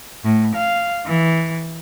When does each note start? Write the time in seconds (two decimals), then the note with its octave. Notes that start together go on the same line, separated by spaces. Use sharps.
0.24 A2
0.55 F5
1.06 E3